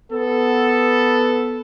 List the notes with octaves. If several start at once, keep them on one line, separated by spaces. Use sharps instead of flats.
B3 A4